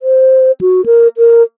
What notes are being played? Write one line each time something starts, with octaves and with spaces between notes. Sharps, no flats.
C5
F#4
A#4
A#4